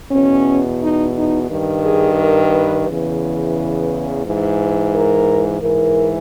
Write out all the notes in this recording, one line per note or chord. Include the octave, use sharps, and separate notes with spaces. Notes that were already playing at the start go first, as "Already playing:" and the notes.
E2 B2 C#4
D#4
D#4
G2 D#3
G#4
A#4
B4
E2 C#3 E3 B4
G#2 E3
A#4
G#2 E3 A#4